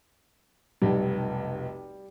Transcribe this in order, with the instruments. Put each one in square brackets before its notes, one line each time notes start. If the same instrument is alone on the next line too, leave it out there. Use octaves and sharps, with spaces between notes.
[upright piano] F1 B1 [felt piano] G3